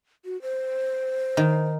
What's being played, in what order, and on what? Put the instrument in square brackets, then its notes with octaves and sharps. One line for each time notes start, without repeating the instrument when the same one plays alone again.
[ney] F#4
C5
[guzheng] D#3